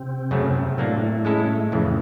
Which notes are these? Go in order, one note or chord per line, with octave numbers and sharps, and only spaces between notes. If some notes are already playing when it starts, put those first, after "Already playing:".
Already playing: C3 C4
F#2 C#3 F#3 A3
A2 F#3 A3 A#3 D4
G#3 C#4 E4 A4
F2 A2 C#3 E3 A3